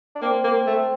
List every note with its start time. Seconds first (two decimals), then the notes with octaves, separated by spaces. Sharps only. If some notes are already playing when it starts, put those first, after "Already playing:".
0.15 D4
0.22 A#3 C4
0.44 A#3
0.67 A3